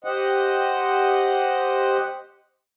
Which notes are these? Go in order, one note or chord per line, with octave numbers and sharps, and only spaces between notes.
G4 C5 D#5 F#5